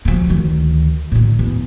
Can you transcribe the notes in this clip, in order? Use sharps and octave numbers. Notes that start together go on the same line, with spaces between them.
C#3 F3
D2 D#3
A2 D3
E2